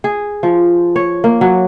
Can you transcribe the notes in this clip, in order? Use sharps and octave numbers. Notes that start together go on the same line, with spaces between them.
G#4
F3
C#5
A#3
F#3